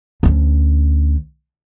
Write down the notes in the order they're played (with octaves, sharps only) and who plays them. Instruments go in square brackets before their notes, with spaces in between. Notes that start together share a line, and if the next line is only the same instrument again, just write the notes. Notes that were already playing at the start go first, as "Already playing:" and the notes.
[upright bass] D2 C#4